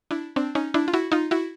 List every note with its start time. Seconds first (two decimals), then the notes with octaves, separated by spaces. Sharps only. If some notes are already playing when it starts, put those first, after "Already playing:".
0.11 D4 E4
0.36 C4 D4
0.55 C#4 D#4
0.74 D4 E4
0.88 F4
0.93 E4 F#4
1.12 D#4 F4
1.31 E4 F#4